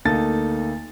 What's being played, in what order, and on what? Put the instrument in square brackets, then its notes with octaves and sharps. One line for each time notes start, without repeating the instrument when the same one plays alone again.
[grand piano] D2 A#3 D#4 A4 A6